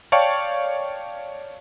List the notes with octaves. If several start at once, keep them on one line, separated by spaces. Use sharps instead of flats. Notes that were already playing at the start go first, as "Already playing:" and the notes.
C#5 D5 F5 G5 A5 C#6